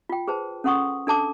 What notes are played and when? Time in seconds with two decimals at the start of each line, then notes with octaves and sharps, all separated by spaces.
0.09 F4 G5
0.28 G#4 B4 C5 A5
0.64 C#4 A4 F#5 C6 C#6 D#6
1.07 D4 A4 A5 D6